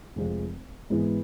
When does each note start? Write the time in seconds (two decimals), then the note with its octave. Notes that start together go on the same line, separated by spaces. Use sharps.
0.16 F1 F2 C3 F3 G#3
0.90 G#2 E3 G#3 B3 E4